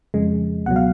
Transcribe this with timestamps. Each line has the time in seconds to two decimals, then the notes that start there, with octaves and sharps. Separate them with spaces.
0.14 F2 C#3 G#3
0.66 C#2 B2 F#3 F#5
0.76 F5